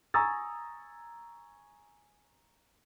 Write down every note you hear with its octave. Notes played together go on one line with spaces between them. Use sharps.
G#5 A#5 C#6 D#6 E6 A6